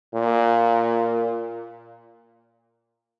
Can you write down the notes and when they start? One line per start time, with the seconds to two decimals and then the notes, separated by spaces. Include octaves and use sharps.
0.14 A#2